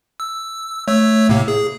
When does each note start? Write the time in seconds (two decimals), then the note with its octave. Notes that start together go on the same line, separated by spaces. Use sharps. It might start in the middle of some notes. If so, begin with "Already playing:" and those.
0.20 E6
0.88 A3 C#5 E6
1.29 A2 C3 A#3
1.48 G#4